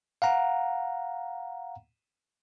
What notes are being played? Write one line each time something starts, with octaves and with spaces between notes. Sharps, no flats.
F5 F#5 A#5